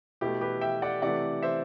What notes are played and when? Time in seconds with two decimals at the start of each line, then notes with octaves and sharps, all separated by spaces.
0.21 B2 A3 E4 G4
0.41 G4 B4
0.61 E5 G5
0.82 D5 F#5
1.02 C3 E3 A3 D5 F#5
1.43 C5 E5